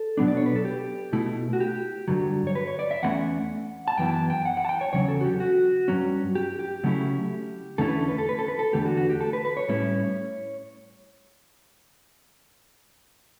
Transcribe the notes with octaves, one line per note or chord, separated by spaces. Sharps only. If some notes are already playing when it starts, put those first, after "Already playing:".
Already playing: A4
B2 F#3 B3 D4
D5
C#5
B4
A4
G4
B2 A3 E4
F#4
G4
G2 D3 F#3
C#5
B4
C#5
D5
E5
E2 D3 A3 C#4 F#5
A5
F#2 E3 B3 E4 G5
A5
G5
F#5
F#5
A5
G5
C#5
E2 C#3 F#3 C#4 C#5
A4
F#4
G4
F#4
G2 F#3 C#4
G4
G4
C#3 F#3 A3 C#4 E4
E2 D3 A3 C#4 E4 A4
B4
A4
B4
A4
B4
A4
B4
A4
E2 D3 A3 G4
F#4
F#4
G4
A4
B4
B4
C#5
A2 G3 C#4 E4